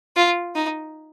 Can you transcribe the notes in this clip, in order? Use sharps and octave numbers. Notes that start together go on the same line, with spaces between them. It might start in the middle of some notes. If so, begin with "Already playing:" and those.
F4
D#4